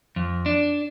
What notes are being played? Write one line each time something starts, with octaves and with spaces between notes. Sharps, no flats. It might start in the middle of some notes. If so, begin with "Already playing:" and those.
F2
D4